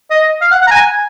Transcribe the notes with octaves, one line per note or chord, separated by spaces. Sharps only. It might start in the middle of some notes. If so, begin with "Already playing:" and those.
D#5
F5
F#5
F#5
A#5
G#5